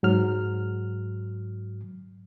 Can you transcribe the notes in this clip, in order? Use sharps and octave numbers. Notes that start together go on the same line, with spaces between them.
G#2 F#3 F6